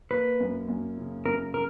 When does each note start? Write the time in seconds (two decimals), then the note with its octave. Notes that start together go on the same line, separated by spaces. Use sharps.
0.11 A#3 B4
0.40 F#2
0.68 F#2
0.97 C#3
1.25 F#2 A#4
1.54 C#3 A#4